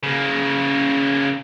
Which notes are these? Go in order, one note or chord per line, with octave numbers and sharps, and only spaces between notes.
C#3 A#3